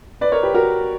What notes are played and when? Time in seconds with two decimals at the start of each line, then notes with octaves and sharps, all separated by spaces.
0.21 B4 D5
0.32 A#4 C#5
0.43 G4 B4
0.54 F#4 A#4